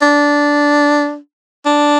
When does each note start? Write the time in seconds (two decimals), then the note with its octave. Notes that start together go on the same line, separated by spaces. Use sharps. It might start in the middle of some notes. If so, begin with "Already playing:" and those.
0.02 D4
1.66 D4